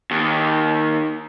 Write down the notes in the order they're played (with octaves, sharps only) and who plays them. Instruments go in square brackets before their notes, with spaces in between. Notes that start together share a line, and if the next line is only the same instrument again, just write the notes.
[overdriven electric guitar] D#2